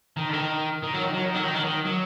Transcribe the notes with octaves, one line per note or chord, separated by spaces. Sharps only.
D#3
D3
D#3
D#3
F#3
D#3
F#3
D#3
F#3
D#3
F#3
D#3
F#3